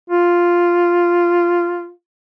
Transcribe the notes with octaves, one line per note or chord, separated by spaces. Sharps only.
F4